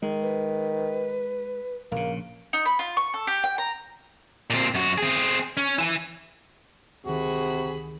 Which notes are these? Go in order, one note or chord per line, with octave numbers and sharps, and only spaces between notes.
D#3 G#3
B4
A#1 C#3 A#3
D#4
B5
F4
C#6
A4
G4
G5
A#5
A#2 C4
F#2 F#4
C4 G#4
C#4
E4 G#5
C#2 C3 D#3 F#4 G#4 B5